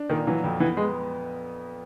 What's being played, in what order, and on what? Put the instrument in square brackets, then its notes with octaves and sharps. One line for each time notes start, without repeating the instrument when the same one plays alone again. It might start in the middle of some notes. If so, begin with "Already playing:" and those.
Already playing: [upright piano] D4
[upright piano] A#2 [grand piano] D#3
[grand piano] E3 [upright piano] F#3
[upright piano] F2
[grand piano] E3 [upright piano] B3
[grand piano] G#3